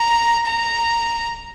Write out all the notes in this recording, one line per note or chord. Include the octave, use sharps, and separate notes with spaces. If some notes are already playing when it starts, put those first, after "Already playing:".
Already playing: A#5
A#5